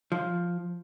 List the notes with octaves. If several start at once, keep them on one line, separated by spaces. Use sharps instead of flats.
F3